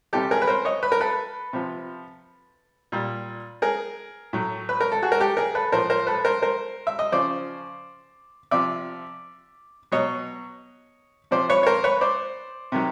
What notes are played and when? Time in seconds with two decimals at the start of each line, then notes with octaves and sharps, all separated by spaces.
0.13 C3 E3 G3 G4 A4
0.31 G#4 A#4
0.42 B4
0.48 A#4 C5
0.65 C#5 D#5
0.83 B4
0.92 A#4
1.00 A4 B4
1.53 C3 F3
2.92 A#2 G3
3.62 G#4 A#4
4.33 A2 F#3
4.69 B4
4.80 A#4
4.92 A4
5.02 F#4 G#4
5.12 A#4
5.20 G4 A4
5.37 G#4 A#4
5.55 A4 B4
5.72 A2 F3 A#4 C5
5.90 A#4 C5
6.07 A4 B4
6.25 A#4 C5
6.42 A#4 C5
6.87 E5
6.99 D#5
7.12 C#3 F3 C5 D5
8.51 C3 F3 D5 E5
9.92 B2 F#3 C#5 D#5
11.31 C3 F3 C5 D5
11.49 B4 C#5
11.63 C#5
11.66 A#4 C5
11.84 B4 C#5
12.01 C5 D5
12.72 C3 D#3 F#3